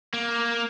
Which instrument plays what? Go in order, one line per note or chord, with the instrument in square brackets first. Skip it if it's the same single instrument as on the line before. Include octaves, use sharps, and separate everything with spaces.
[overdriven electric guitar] A#3